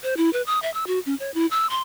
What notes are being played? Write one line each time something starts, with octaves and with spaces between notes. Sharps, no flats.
C5
E4
B4
D#6
E5
E6
F#4
C#4
C#5
E4
E6
C6